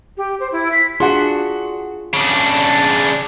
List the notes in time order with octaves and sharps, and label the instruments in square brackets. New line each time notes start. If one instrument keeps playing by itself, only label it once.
[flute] G4
C5
E4
B6
[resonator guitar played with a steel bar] D4 F#4 [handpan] F4 G#4 [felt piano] F#5 C6
[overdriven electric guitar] C#3 D4